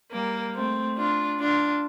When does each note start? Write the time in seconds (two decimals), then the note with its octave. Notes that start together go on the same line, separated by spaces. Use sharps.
0.11 G3 A#3
0.54 A3 C4
0.96 D4 F4
1.39 D4 F4